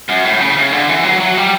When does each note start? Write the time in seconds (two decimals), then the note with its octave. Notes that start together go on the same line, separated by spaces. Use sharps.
0.09 F#2
0.25 A2
0.40 C#3
0.57 C#3
0.72 D3
0.89 E3
1.04 F#3
1.20 F#3
1.37 G3